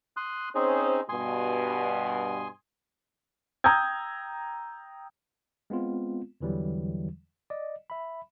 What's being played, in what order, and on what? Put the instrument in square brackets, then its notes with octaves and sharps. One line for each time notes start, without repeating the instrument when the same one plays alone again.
[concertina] C6 D#6 F#6
[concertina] C4 D#4 G#4 [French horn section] C#4 C5
[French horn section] G2 B2 [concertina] G#5 C6 D#6
[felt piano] G5 A#5 D#6 E6 G6 G#6
[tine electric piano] G#3 B3 C4 F4
E2 D3 E3 F#3 G3
D5 D#5
E5 B5